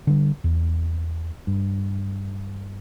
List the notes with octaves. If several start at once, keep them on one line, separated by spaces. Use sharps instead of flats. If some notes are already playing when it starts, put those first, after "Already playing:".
D3 G3
E2
G2